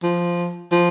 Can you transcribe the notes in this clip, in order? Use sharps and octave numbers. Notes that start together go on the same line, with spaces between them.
F3
F3